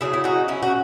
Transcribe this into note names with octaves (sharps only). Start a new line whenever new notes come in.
C#3 F#3 A3 E4 G#4
E4
D#4 F#4
C#4 E4
F#4